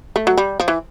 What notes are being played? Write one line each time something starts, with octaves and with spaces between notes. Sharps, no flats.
A3
F#3
G3
F3
E3